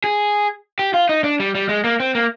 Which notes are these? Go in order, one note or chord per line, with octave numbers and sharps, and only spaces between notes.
G#4
G4
F4
D#4
D4
G3
G3
G#3
A#3
C4
A#3